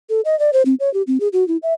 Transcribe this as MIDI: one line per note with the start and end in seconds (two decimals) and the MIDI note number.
0.10 0.21 69
0.25 0.38 75
0.39 0.50 74
0.53 0.62 72
0.65 0.75 60
0.80 0.92 73
0.94 1.02 67
1.07 1.18 60
1.20 1.28 68
1.33 1.47 66
1.48 1.57 64
1.63 1.74 76